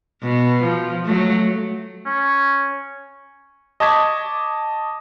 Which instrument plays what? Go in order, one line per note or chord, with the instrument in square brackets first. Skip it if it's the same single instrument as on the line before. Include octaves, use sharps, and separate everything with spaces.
[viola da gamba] B2
F3
F#3 A3
[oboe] C#4
[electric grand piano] D#5 A5 C#6 D6 G#6 B6